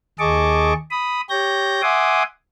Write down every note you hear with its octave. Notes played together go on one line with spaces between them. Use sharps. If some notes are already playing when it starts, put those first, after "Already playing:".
D#2 G#4 D#5 A5 C#6 D6
B5 D#6
G4 C#5 G6 A#6
E5 F#5 G#5 C6 D6 D#6